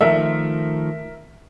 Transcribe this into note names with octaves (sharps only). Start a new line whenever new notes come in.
D#3 F3 A3 A#4 E5